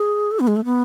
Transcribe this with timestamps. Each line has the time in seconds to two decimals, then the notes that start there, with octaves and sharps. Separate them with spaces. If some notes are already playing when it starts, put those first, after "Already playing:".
Already playing: G#4
0.31 A4
0.40 B3
0.48 G#3
0.56 A3
0.65 B3